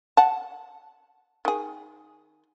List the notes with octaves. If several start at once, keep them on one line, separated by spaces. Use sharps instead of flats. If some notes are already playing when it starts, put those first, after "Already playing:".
F#5 A5
D#3 G#4